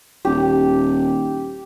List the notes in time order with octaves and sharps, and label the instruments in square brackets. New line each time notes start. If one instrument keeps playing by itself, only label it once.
[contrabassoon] D#1 [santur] G4